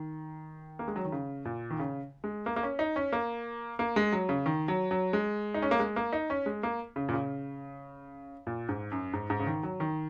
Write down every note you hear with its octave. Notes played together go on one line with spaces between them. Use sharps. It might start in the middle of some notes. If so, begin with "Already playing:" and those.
Already playing: D#3
A#3
G#3
F#3
D#3
C#3
A#2
D#3
C#3
G#3
A#3
A#3
C#4
D#4
C#4
A#3
A#3
G#3
F#3
C#3
D#3
F#3
F#3
G#3
D#4
C#4
A#3
G#3
A#3
D#4
C#4
G#3
A#3
C#3
A#2
C#3
A#2
G#2
F#2
G#2
G#2
C#3
D#3
F#3
D#3